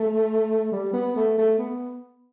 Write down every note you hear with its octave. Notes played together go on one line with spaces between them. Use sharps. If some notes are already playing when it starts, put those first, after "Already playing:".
Already playing: A3
G3
B3
A3
A3
B3